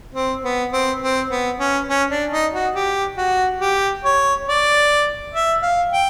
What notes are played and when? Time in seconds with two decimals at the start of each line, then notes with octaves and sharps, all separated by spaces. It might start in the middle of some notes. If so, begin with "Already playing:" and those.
0.15 C4
0.44 B3
0.73 C4
1.02 C4
1.30 B3
1.60 C#4
1.89 C#4
2.10 D4
2.31 D#4
2.53 F#4
2.75 G4
3.17 F#4
3.60 G4
4.04 C#5
4.48 D5
5.33 E5
5.62 F5
5.92 G5